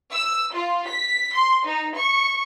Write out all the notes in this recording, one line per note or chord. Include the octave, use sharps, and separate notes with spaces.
E6
F4
B6
C6
D#4
C#6